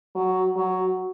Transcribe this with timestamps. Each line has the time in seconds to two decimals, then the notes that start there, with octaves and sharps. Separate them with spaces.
0.15 F#3
0.56 F#3